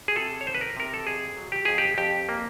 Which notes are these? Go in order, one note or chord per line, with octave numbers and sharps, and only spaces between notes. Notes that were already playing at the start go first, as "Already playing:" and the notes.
G#4
C3 A4
C#5
D#3 C5
B4
A#4
C3 A#4
A4
F2 G#4
F#3
G4
F2 G#4
G4
F2 G4
A#3